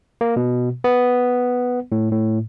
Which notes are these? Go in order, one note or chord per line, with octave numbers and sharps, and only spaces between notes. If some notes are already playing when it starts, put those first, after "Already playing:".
A#3
B2
B3
A2
A2